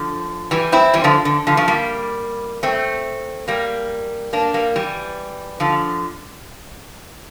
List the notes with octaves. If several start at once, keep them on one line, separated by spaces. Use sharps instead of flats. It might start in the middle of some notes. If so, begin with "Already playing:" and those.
Already playing: D3 F3
E3 G3
C4 E4
E3 G3
D3 F3
D3
D3 F3
F3 A3
G3 A#3
A3 C4
G3 A#3
A#3 D4
G3 A#3
E3 G3
D3 F3